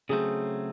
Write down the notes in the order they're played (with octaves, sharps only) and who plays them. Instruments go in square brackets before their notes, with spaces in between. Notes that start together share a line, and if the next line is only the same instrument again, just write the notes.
[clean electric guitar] C#3 F#3 A3 C4 [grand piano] G#4